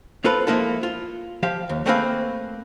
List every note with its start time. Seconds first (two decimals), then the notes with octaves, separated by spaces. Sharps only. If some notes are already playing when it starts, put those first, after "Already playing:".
0.24 C4 F4 A4 B4
0.47 F3 G#3 A#3 E4 A4
0.83 F4
1.43 F3 G4 F5
1.69 D#2
1.86 A3 A#3 C4 G#4 B4 F5